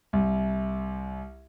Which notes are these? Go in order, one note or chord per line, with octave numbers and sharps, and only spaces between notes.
C2